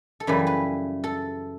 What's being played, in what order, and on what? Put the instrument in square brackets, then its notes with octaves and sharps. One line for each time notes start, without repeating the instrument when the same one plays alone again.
[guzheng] A4
F#2 C#3 E3 G3 B4
B4
A4